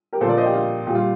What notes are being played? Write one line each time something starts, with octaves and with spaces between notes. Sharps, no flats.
G4 A#4
A#2 A4 C5
F3 A#4 D5
C5 D#5
G4
F4
A#2 G3 F4 G4